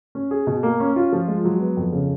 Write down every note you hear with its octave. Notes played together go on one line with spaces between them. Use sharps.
C#4
G#4
B2
A#3
C#4
F4
F3
G#3
F#3
B3
F2
C#3